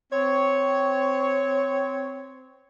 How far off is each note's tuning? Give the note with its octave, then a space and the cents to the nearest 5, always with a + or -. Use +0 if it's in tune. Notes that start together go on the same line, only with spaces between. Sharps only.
C4 -15 C#5 +0